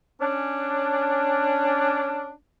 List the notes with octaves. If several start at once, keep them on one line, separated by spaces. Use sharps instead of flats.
C#4 D4